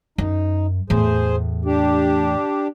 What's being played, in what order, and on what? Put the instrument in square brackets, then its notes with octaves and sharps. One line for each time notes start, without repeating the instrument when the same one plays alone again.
[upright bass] F#2 [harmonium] D#4
[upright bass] E2 A2 [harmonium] G#4 C5
[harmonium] D4 G4